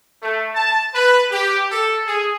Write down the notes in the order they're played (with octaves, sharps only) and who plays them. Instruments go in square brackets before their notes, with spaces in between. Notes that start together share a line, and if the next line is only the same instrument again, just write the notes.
[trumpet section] A3
A5
B4
G4
A4
G#4